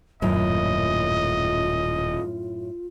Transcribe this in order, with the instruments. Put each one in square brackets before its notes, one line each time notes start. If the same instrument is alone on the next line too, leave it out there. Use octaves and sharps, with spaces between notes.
[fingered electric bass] D#1 [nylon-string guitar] F#2 A2 [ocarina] F4 [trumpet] D#5